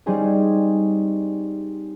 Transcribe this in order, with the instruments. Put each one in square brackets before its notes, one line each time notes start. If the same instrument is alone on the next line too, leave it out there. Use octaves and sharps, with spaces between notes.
[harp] G3 C4 C#4 D#4 G#4 D#5